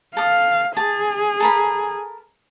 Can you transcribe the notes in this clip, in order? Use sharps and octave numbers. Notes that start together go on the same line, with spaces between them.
A4 F5 D#6
G#4 A5
A4 A#4 B5